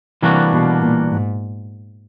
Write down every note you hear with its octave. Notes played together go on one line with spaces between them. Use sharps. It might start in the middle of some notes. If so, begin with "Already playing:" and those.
C3 E3 G3 A#3 D4 F#4
B2
A#2
G#2